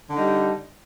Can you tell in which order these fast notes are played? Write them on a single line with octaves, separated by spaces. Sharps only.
D3 D#4 G3